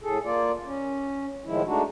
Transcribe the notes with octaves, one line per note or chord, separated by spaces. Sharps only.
A2 G#4 A4
A#3 F4 D5
C#4
A2 D#3 F3 G#3 E4
G#3 A3 D4 D#4 F#4